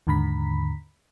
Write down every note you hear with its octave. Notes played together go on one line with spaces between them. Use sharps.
D#2 G#2 D3 A#5 B5 B6